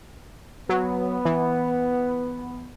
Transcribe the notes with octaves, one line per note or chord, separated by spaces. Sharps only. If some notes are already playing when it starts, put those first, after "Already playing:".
F#3 B3
E3